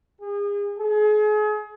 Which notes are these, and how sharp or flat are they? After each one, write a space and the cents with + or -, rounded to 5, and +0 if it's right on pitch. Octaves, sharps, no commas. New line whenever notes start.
G#4 -35
G#4 +35